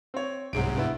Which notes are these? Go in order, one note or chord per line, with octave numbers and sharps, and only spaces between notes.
C4 C#5
C2 G#2 C3 F#3 G#4 D7
G2 B3 E4